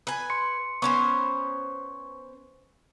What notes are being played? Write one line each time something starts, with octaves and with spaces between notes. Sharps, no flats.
B4 G#5
C6 C#7
B3 C#4 C5 C#6